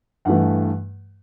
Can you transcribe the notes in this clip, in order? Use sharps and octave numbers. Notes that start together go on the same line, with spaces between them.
G2 E3 A3 F#5